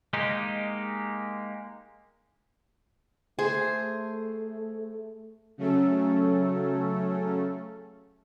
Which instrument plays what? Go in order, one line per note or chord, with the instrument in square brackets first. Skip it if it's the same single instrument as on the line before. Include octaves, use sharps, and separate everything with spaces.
[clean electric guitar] G#3 A#3 D#4 G4
[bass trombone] A3 [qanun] G#4 C5
[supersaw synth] C#3 F#3 A3 C#4 A4